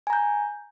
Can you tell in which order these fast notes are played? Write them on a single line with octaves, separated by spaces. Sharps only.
G#5 A#5 G6